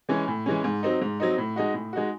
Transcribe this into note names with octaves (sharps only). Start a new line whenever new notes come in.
E3 G#3 C#4
A2
E3 G#3 C#4
G#2
F#3 C4 D#4
G#2
F#3 C4 D#4
A2
G#3 D#4 F#4
A2
G#3 D#4 F#4